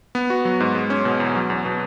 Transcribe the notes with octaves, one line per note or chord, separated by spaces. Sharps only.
B3
F#4
F#3
G#2
G#3
C#4
B2
E2
F#3
E2
B2